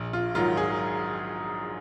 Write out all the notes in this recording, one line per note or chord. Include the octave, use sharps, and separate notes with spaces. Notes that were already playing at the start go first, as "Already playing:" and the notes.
Already playing: A#1
F4
G#2 D#3 F#3 F4
G#4